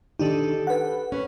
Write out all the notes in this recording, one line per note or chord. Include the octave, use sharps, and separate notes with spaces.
D#3 D4 D#4 G4 A4
B4 F#5
C#4 B4